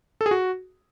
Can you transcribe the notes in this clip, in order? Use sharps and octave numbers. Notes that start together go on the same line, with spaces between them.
A4
G#4
F#4